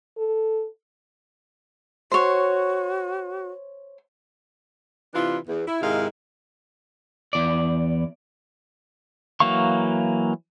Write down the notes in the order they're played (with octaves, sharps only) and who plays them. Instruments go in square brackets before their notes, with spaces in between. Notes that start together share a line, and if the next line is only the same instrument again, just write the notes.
[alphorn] A4
[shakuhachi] F#4 [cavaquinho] C5 C#5
[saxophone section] C3 E3 D4 E4 F4
E2
E4
G#2 C3 D#3 G#3 E4 F5
[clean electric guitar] E2 D5
[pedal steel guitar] E3 F#3 A#3 F5 C#6